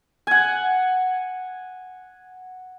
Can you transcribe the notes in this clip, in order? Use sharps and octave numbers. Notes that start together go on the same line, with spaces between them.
F#5 G#5